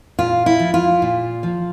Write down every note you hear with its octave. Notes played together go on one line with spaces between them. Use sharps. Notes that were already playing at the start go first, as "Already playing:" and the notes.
A#2 F4
E4
F3
F4
A#2
F3